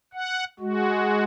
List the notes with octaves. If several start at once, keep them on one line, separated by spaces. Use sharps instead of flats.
F#5
G#3 F#4